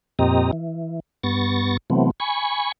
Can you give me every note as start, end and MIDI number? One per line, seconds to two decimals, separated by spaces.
0.19 0.51 41
0.19 0.51 46
0.19 0.51 60
0.19 0.51 67
0.19 0.51 75
0.19 0.51 82
0.53 1.00 52
1.23 1.77 43
1.23 1.77 59
1.23 1.77 85
1.23 1.77 93
1.23 1.77 94
1.90 2.11 48
1.90 2.11 52
1.90 2.11 54
1.90 2.11 57
1.90 2.11 59
1.90 2.11 60
2.20 2.72 80
2.20 2.72 83
2.20 2.72 85